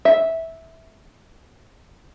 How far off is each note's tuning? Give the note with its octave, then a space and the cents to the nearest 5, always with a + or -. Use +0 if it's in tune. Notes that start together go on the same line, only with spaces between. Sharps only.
E5 -10